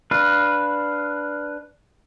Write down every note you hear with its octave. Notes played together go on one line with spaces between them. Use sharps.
D4 B4 F5